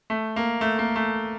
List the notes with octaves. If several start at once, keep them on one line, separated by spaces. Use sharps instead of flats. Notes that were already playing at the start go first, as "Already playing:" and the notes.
A3
A#3
A3
A#3
A3